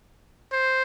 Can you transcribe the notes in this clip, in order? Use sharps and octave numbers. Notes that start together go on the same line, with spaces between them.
C5